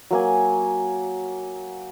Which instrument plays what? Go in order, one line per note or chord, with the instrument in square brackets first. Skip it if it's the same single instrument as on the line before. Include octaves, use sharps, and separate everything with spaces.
[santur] F#3 A#3 G#5